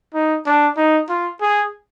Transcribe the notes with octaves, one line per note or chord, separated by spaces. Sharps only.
D#4
D4
D#4
F4
G#4